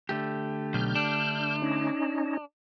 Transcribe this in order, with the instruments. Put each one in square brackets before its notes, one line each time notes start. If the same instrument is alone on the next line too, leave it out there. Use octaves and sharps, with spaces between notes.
[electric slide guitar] D3 A3 G4
[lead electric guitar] B1 [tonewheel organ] F6 G6
[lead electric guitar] D4
[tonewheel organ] C#4 D#4